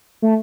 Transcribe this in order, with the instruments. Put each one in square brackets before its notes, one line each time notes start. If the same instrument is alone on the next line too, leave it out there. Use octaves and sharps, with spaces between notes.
[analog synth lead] A3